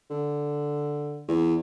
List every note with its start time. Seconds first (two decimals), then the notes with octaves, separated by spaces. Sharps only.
0.10 D3
1.28 E2